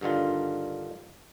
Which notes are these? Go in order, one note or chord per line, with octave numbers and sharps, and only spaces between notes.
G2 D3 D#3 F4